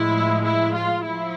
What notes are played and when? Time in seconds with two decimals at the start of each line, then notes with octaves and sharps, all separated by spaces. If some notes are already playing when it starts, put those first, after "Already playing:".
Already playing: A2 F3 G#3 E4
0.44 E4
0.75 F4
1.05 F3 E4